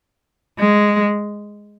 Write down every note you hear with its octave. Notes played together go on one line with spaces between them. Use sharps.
G#3